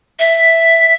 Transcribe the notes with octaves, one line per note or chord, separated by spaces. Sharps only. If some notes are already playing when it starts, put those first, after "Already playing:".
E5